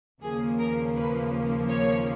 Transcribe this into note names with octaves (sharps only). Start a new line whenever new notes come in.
D#2 C#3 F3 A#3 G#4
A#4
B4
C#5